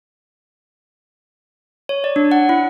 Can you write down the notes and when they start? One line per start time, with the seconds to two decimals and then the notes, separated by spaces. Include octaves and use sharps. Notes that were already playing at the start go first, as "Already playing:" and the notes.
1.89 C#5
2.04 D5
2.16 D4
2.31 F#5
2.49 E4